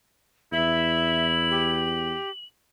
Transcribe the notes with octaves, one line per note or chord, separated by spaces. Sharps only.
E2 E4 E5 F#7
G4